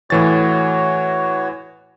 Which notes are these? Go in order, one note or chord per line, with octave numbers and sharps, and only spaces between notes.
A2 E3 F#4 C#5 A6